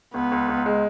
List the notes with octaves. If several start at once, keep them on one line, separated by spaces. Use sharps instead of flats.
C#2 B3
C#2
C#2
G#3